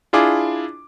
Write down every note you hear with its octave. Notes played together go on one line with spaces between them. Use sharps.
D4 E4 F4 G#4 D6